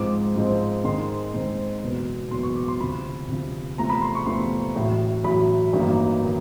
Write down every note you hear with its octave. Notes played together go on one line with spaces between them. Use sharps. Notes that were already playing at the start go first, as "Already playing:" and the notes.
Already playing: G#2 F3 G#3 C4 D6
G#2 F3 G#3 C4
G#2 D#3 G#3 C4 C6
G#2 D#3 G#3 C4
F#1 E2 B2 F#3 B3
F#1 E2 B2 F#3 B3 C6
C#6
D6
C6
D2 C3 F3 B5
D2 C3 F3
E2 C3 F3 A3 C4 A#5
B5
C6
C#6
E2 C3 F3 A3 C4 C6
A1 A2 F#3
A1 A2 F#3 B5
A1 G2 D#3 F#3 A#3
D#3